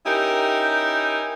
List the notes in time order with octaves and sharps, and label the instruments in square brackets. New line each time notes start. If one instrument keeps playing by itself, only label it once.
[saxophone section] C#4 D#4 E4 G4 A#4